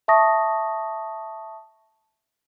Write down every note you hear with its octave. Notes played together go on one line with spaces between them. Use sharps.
E5 A5 C#6 D#6 A#6